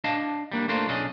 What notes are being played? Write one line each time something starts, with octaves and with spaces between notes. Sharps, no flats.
D4 D#5 F5 A5
G3 A#3 D4
A3 A#3 D4 F4 A#4 C5
B1 C#4 D4 E4 G#4 D#5